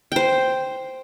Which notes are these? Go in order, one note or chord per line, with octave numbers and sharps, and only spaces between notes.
C5 G5